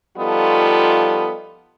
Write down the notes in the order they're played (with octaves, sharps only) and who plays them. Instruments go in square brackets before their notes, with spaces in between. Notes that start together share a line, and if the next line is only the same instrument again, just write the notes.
[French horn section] F3 G3 B3 D#4 F4 A4